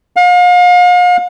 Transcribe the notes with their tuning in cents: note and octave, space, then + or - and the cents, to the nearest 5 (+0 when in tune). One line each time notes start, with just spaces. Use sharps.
F5 +40